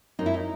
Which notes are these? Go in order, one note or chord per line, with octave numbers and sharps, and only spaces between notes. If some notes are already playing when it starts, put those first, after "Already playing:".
F#2 F#3 C4 D#4
E4
D#4